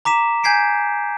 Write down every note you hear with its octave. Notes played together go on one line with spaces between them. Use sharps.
A#5 D6 B6 E7
G#5 G6 G#6 B6 C7 D7